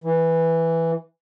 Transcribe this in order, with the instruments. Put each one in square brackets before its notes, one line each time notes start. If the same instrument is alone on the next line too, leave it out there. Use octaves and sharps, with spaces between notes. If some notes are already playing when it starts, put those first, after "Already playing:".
[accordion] E3